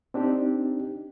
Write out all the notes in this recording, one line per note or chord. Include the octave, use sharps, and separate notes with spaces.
C4 D4 D#4 G4